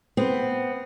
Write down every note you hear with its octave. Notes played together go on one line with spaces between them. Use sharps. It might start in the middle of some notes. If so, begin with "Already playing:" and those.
B3 C4